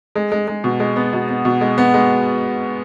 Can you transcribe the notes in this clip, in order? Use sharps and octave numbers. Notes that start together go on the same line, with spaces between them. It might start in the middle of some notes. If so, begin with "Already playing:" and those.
G#3
G#3
G#3
B2
G#3
B3
B2
B3
B2
G#3
B3
G#3